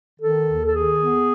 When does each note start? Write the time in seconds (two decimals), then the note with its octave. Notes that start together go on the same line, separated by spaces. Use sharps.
0.20 D#3 A4
0.46 D#2
0.66 A4
0.73 D#3 G#4
1.00 B3